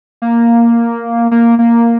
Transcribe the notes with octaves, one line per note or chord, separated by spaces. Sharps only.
A#3
A#3
A#3